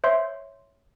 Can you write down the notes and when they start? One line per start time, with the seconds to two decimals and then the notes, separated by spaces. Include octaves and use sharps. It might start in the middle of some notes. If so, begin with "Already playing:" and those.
0.04 C5 C#5 E5 C6